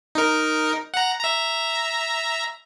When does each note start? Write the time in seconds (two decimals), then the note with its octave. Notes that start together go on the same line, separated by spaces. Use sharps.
0.15 D#4 A#4
0.94 F#5 A#5
1.21 E5 A#5